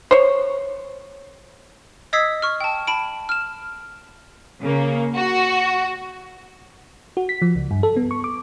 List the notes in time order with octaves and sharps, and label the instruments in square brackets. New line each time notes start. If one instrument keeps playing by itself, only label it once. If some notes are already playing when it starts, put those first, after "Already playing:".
[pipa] C5 C#5
[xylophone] D#5 D#6 E6 G#6 B6 C7
C#6 F6
G5 A5
A5 B5 D7
F6 E7
[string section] C#3 A#3
F#4
[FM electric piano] F#4
B6
F3
C#2
G2
A4
B3
C#6
D6